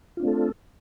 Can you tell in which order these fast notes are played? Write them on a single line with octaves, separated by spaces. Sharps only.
F4 D4 C4 A3 A4